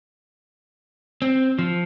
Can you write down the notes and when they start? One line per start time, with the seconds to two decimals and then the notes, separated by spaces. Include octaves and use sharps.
1.22 C4
1.59 F3